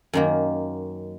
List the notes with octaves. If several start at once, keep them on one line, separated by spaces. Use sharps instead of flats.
F#2 D#3 A#3